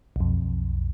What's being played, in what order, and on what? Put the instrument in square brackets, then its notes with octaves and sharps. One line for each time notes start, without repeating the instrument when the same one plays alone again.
[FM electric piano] B1 F2